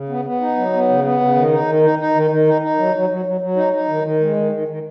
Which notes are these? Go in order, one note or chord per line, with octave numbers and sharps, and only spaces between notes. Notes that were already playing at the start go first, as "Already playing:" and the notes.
Already playing: C#3
B3
B3
D#4
F#3
B3
C#3
B3
C#3
D#3
D#4
D#3
D#4
D#4
D#3
D#3
D#4
D#4
F#3
F#3
F#3
F#3
F#3
D#4
D#4
D#3
D#3
G#3
D#3
D#3
D#3